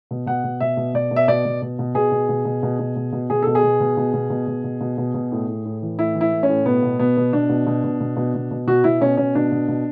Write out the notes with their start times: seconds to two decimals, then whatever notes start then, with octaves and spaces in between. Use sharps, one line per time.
0.11 B2
0.26 B2 F#5
0.44 B2
0.61 B2 E5
0.77 B2
0.94 B2 D5
1.11 B2
1.16 E5
1.28 B2 D5
1.45 B2
1.62 B2
1.79 B2
1.95 B2 G#4
2.12 B2
2.29 B2
2.45 B2
2.63 B2
2.79 B2
2.96 B2
3.13 B2
3.30 B2 G#4
3.43 B2 A4
3.55 G#4
3.63 B2
3.80 B2
3.97 B2
4.13 B2
4.30 B2
4.47 B2
4.64 B2
4.81 B2
4.98 B2
5.14 B2
5.32 A2
5.48 A2
5.65 A2
5.82 E3
5.99 A2 E4
6.15 E3
6.21 E4
6.32 A2
6.43 C#4
6.49 A2
6.66 B2 B3
6.83 B2
6.99 B2 B3
7.17 B2
7.33 B2 D4
7.49 B2
7.67 B2
7.84 B2
8.00 B2
8.17 B2
8.35 B2
8.51 B2
8.67 B2 F#4
8.84 B2 E4
9.01 B2 C#4
9.17 B2 C#4
9.35 B2 D4
9.52 B2
9.68 B2